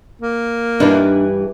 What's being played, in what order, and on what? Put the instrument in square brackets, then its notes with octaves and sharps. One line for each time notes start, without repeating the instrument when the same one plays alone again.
[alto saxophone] A#3
[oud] G2 E3 [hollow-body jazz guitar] D4 D#4